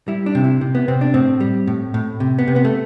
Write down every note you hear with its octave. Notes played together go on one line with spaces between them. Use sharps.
G3 E4
D4
C3
E4
C3
B3
C3 C4
D4
A2 C4
G3
A2
A2
C3
B3
C3
B3
A3